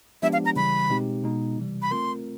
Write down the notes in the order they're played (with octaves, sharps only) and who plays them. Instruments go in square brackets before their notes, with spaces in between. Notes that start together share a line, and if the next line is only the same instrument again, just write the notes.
[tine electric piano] F3 G#3 B3 D4 G4 [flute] E5
[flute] F5
A#5
[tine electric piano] C#3 E3 G3 [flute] B5
[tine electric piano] B2 G#3 C4 D#4 G4
B2 G#3 B3 D#4
C3 E3 G3
[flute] B5
[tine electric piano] A3 C4 F4 A#4 [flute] C6